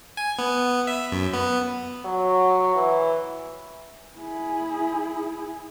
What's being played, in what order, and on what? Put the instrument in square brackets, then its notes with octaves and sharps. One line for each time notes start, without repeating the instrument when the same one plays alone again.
[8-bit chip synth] G#5
B3
E5
F#2
B3
[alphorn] F#3
E3
[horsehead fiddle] E4 G#4